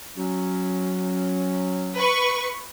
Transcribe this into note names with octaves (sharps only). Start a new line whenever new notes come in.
F#3 C#4
B4 C#6